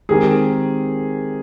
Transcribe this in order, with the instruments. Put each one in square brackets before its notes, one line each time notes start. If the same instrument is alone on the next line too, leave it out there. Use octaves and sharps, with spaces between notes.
[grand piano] D#3 G#3 C4 G4 A#4 [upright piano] G#4